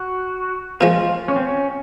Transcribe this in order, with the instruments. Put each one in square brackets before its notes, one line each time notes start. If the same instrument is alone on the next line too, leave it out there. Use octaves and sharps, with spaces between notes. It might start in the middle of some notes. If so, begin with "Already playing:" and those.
Already playing: [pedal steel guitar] F#4
[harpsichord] A#2 F3 G#3 [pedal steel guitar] F4
[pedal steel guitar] C#4
C4
C#4